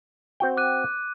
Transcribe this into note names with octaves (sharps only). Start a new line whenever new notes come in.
C4 F#4 G5
D6 F#6 D#7